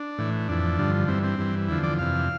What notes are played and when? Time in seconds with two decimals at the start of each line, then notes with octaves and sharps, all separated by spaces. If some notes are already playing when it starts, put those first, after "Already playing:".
Already playing: D4
0.18 A2 E3
0.48 F2 E3 D4
0.79 G2 D3 F3
1.08 G2 E3 C4
1.24 C4
1.39 G2 E3
1.68 E2 D3 F3 E4
1.83 D5
1.99 F2 C3 E3 F5